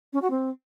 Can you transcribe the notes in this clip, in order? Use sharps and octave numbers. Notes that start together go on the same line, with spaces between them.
C#4
F#4
C4